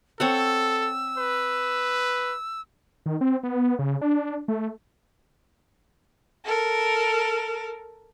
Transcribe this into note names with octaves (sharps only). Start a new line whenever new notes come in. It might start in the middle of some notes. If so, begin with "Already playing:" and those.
C4 A4 C#5 F#5 E6
B4
D#3
C4
B3
C#3
D4
A3
A4 A#4